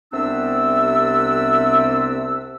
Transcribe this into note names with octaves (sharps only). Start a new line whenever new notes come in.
C2 C3 B3 D4 E5 E6